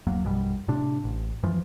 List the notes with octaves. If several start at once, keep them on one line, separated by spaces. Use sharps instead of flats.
D1 F#2 F#3 A#3
A#1 F#2 B2 G3
A2 C3 D4
A1
F#2 E3 F3